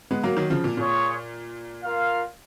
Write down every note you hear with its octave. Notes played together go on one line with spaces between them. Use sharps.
G#3 B3
F#3 A#3
D#3 F#3
C#3 F3
A#2
A#2 F4 G#4 C#5
F4 A#4 F5